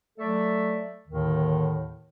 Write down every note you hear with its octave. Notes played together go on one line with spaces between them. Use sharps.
F#3 A3 A4 D5 E5
D#2 A2 D3 D#3